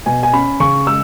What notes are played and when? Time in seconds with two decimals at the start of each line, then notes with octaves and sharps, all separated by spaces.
0.06 B2 G#5
0.23 G#5
0.33 C#4 B5
0.60 C#3 C#6
0.87 G#3 E6